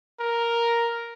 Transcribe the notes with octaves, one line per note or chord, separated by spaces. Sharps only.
A#4